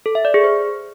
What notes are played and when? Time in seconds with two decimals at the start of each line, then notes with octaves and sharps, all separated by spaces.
0.06 A4
0.15 E5
0.25 D5
0.34 G#4
0.44 C5